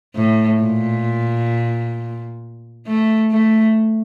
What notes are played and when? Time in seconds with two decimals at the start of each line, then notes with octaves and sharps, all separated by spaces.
0.16 A2
0.61 A#2
2.87 A3
3.31 A3